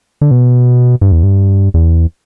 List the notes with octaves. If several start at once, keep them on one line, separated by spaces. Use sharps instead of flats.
D3
B2
G2
E2
G2
E2